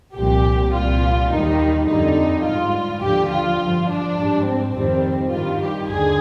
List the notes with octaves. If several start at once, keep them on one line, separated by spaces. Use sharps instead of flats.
C2 A#2 F3 G4
C2 A#2 G3 F4
D#2 D#3 G3 D#4
F2 D3 G3 D#4
G#2 G3 F4
D#2 D3 F3 G4
F4
G2 F3
D4
G#2 G3
C4
F2 D#3 G3
G2 D#3 G3 F4
G4
D#2 D3 G#4